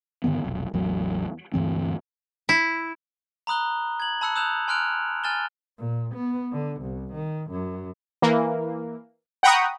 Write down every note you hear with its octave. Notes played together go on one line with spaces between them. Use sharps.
G2 D3 D#3 B3
F1 B1
A1 E2 F#3
D2 G2 E3 C4
E4
A#5 B5 D#6 F#6 G7
G#6 F#7
A5 B5 E6 F#6 C#7
D#6 E6 F#6 G6 E7 F7
G#5 C6 F6 F#6 D7 F7
G#5 F6 A6 E7 G7
A#2
B3
D3
C2
D#3
F#2
E3 A#3
F#5 G5 A#5 B5 C#6 D#6